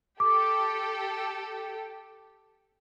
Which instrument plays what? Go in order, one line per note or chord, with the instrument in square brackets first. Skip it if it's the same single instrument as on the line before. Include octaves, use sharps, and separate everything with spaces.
[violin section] G4 A4 [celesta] D6